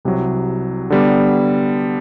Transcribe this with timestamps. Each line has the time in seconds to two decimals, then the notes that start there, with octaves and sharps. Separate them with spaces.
0.05 C2 C3 F#3
0.90 D3 G3 B3